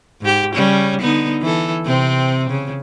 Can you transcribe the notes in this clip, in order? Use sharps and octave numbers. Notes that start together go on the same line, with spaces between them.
G#2 G4
C#3 G3 C#4
D3 B3 D#4
E3 A4
C3 C4
C#3